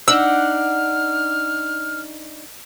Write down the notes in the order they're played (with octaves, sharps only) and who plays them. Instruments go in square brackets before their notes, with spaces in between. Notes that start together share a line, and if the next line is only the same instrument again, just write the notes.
[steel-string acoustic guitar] D4 D#4 [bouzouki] F#5 [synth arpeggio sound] E6 [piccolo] F6